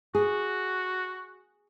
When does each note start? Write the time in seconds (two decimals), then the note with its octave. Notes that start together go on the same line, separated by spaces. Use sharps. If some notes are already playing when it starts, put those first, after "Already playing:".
0.15 F#4 G#4